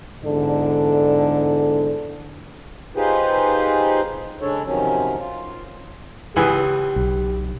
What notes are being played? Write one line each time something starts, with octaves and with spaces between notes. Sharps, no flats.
E2 G#2 D3 A4 D5
D#4 F4 G4 G#4 B4 C5
C#3 G#3 D4 A4 C#5
C3 D#3 F3 F#3 C#4
F4
C#2 E3 G4 G#4
B1